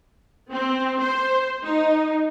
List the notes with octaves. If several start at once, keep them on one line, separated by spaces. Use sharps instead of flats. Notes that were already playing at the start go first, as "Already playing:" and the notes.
C4
C5
D#4